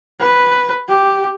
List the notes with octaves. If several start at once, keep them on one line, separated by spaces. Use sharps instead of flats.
B4
G4